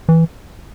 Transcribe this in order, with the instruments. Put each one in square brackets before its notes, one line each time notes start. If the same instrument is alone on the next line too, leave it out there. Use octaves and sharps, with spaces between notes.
[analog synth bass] E3